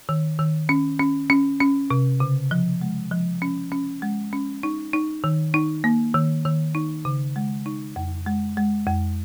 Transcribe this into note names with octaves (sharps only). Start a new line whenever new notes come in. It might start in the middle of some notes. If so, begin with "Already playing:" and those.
D#3
D#3
C#4
C#4
C#4
C#4
C3
C#3
F3
G#3
F3
C#4
C#4
G#3
C#4
D#4
D#4
D#3
D#4
A#3
D#3
D#3
D#4
C#3
G#3
D#4
F2
G#3
G#3
F2